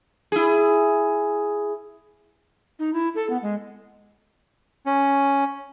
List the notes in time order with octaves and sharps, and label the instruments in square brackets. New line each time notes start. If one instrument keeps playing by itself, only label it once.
[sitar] E4 G#4
[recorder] D#4
E4
A4
B3
G#3
[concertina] C#4